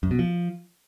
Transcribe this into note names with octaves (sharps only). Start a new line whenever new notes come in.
F#2
B2
F3